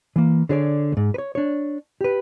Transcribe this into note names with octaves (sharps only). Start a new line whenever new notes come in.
E3 A#3
D3 G#4 C#5 D5
D2 G#2
B4 C#5
D4 C#5
G4 B4